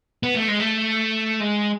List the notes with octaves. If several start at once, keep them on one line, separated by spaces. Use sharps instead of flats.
B3
A3
G#3
A3
G#3